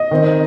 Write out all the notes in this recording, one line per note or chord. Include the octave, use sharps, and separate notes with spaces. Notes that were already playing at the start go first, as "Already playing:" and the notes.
Already playing: D#5
D#3 C4 D#4